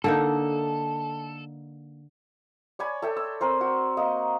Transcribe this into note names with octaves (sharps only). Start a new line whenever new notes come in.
D3 A#3 D#4 A4
C#5 D5 G#5 B5
A4 E5 G5
E6
C4 A#4 C5
F#4
A#3 D#5